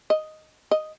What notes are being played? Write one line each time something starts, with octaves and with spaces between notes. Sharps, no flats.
D#5
D#5